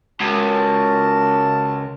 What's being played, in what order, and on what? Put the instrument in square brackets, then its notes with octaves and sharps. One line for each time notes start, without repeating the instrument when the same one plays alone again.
[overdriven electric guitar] C#2 [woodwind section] F#4 A#4 A5